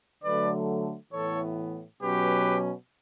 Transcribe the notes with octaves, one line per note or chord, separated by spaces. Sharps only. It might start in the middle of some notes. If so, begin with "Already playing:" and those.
D3 F#3 A3 B4 D5
A2 E3 B3 A4 C#5
B2 F#3 C#4 G4 B4